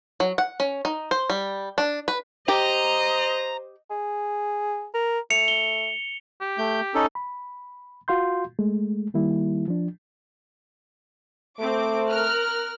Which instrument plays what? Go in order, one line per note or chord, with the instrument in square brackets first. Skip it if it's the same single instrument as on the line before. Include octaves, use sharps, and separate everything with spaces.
[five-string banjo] F#3
F#5
C#4
D#4
C5
G3
D4
B4
[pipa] G4 [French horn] C5 [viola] D#5 [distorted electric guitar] A#5
[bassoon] G#4
A#4
[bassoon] A3 [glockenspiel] C#7 F7
[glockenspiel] G7
[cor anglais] G4
[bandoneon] A3 G6
C#4 D#4 A4
[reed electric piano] B5
F4 F#4 F5 C6 G6
G#3 A3
D#3 G3 A#3 E4
F3 D4
[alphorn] A3 [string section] C4 D6
[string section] A#4 F6 F#6